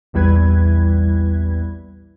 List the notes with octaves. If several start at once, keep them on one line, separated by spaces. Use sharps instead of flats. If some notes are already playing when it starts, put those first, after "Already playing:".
A#1 E2 G3 E4 B4 G#6